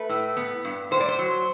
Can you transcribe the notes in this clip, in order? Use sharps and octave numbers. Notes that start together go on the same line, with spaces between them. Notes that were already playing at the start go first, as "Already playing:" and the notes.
Already playing: A3 B4
A2
B3
G2
A2 C5
D5
C5
F#3